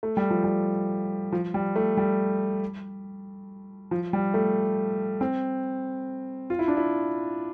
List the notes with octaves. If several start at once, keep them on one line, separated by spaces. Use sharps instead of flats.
A3
G3
F3
G3
F3
G3
A3
G3
F3
G3
A3
C4
F4
E4
D4
E4